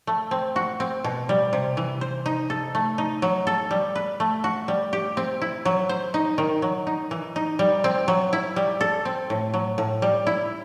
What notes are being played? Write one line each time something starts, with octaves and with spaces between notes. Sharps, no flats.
A3
C4
F#4
C4
B2
G3
C3
E3
C5
D#4
A4
A3
D#4
F#3
A4
G3
B4
A3
F#4
G3
G4
C4
E4
F#3
C5
D#4
D#3
F#3
D#4
E3
D#4
G3
C4
F#3
E4
G3
A4
C4
A2
F#3
A2
G3
E4